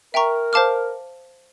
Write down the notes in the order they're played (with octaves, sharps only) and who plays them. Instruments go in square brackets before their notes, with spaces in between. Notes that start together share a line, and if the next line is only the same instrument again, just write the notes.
[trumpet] A#4 [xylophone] E5 G5 A#5 C#6
[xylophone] C5 F5 A5 D6 F6